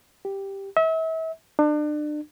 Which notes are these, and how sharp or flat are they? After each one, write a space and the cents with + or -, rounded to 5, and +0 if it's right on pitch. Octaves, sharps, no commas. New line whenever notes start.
G4 +0
E5 -35
D4 +35